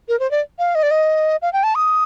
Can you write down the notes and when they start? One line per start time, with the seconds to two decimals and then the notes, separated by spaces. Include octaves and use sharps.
0.08 A#4
0.19 C5
0.31 D5
0.59 F5
0.75 D#5
0.83 D5
0.91 D#5
1.42 F5
1.53 G5
1.63 A5
1.75 D#6